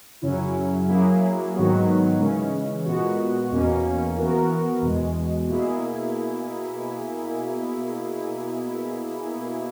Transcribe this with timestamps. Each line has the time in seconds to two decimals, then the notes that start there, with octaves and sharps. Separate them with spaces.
0.22 F#2 C#3 F#3 C#4 E4
0.88 F#3 A#3 E4 G#4
1.54 G#2 D#3 F#3 B3 F#4
2.19 C#3 E3 G#3 C#4
2.85 A#2 G#3 B3 F#4
3.51 E2 B2 A#3 C#4
4.17 E3 B3 F#4 A#4
4.82 E2 B2 G#3
5.49 B2 A#3 E4 G#4